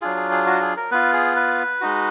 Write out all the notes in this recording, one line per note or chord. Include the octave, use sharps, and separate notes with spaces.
F#3 D4 F4 G#4
G#4
G#4
F#4
G#4
A#4
B3 F4 B4
G#4
B4
G#3 D#4 F#4